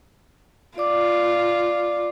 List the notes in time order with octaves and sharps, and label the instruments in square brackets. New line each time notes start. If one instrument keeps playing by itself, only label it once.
[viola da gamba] F4 [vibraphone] D5 D6